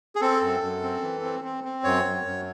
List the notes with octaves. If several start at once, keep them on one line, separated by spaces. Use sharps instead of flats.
G#4
C4 A4
F#2
F#2
C4
E3
C4
C4
C4
F#2 C#5
F#2
F#2